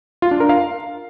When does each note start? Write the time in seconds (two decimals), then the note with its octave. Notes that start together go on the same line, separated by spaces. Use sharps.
0.22 F4
0.31 D4
0.40 A#4
0.49 F5